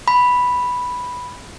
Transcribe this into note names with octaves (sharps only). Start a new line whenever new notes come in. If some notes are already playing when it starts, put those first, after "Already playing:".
B5